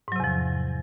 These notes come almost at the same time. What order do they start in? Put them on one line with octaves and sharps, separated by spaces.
G#2 F#3 C3 E2 F3